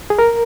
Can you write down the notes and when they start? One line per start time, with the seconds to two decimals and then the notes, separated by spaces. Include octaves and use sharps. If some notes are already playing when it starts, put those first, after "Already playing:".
0.10 G#4
0.19 A#4